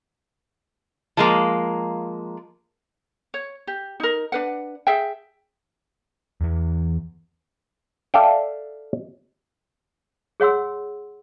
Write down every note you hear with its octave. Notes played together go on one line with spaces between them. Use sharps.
F3 G#3 A#3
C#5
G4
D#4 A#4
D4 B4 F#5
G#4 E5 G5
E2 E3
A4 D5 E5 F5 G5
G#4 C#5 F#5 C6 E6